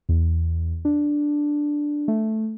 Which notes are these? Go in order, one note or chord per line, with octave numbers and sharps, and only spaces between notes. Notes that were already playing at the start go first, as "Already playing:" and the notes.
E2
D4
A3